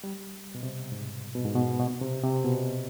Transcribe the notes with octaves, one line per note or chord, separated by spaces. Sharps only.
G3
B2
C3
G#2
B2
G#2
B2
B2
C3
C3
B2